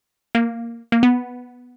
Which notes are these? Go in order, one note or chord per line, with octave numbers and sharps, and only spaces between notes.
A#3
A#3
B3